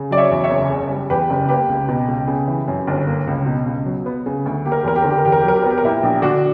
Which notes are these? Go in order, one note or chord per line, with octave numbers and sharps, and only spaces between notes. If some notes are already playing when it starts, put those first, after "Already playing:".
Already playing: C#3
F#3 D5
C#5 E5
E2
C#5 E5
F#1
C#3
G3
E2 G4 B4
F#1
A#3 G4 B4
C#2
B2
C#2
C#3
E3
F#2
G1
A#3
C#2
B2
C#2
F#3
B3
C#3
D2
A#3 G4
A#4
G4
E2 A#4
G4
D3 A#4
G4
A#4
E2 G4
A#4
G4
F#3 A#4
G4
B3 A#4
G4
A#4
A#2 E4 G4
A#1
D3 D4 F#4